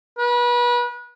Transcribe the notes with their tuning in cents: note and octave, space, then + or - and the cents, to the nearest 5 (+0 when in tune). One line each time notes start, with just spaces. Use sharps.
B4 -30